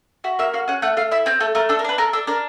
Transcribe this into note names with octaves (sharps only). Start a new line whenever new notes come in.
F#4 E5
A#3 E5
F#4 F5
C#4 F#5
A3 F#5
A3 F5
E4 E5
C4 C#5
A3 A4
A3 A#4
D4 A4
A#4
D4 B4
A4 A#4
D4 A4
D4 A#4